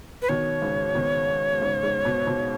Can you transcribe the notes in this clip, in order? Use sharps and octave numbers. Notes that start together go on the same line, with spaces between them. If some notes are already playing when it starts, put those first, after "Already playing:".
B4
B2 D#3 C#5
G#2 C#3
B2 D#3
G#2 C#3
G#2
B2
B2